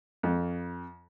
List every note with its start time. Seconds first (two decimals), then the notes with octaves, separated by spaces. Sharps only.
0.23 F2